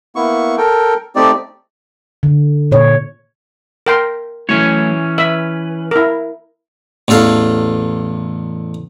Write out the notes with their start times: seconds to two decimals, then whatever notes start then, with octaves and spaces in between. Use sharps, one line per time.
0.16 A#3 B3 E4 C#6
0.58 A4 A#4 G5
1.16 A3 C4 D#4 G4 D5
2.23 D3
2.72 A#2 C#5
3.86 A#4 G5 C6
4.49 E3 F#3 A3 C#4 E4 C#5
5.18 B4 E5
5.91 E4 A#4
7.08 A1 E2 A4 F5